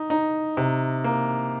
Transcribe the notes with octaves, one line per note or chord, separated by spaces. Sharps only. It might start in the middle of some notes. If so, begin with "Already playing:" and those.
Already playing: D#4
D#4
C3
A#3